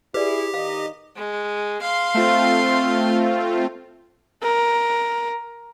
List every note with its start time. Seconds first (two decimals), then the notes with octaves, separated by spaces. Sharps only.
0.14 E4 G4 G#4 B4 D5
0.54 D#3 D#4 D#5 F5
1.17 G#3
1.82 F5 C6
2.14 A3 C4 F4
4.42 A#4